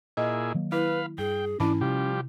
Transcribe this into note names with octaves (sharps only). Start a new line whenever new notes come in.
A#2 E4 G#4 D#5
D#3 F#3 A#3
E4 B4 F5 B5
G2 G#4 G5
G#2 E3 C#4 D4 E4 A5 B5
C3 F3 G3 G4